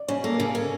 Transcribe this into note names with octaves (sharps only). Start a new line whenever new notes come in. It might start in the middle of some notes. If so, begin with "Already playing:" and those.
Already playing: D5
C#3 C#5
A#3 A4
A#4
C#3 A4
C#4 A#4